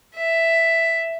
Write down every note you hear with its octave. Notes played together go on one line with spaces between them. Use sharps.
E5